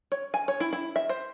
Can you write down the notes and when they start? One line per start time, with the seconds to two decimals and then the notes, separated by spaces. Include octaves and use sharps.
0.12 C#5
0.34 G#5
0.48 C#5
0.60 E4
0.73 E4
0.96 E5
1.09 C5